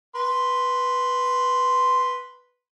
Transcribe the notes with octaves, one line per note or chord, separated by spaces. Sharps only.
B4 C6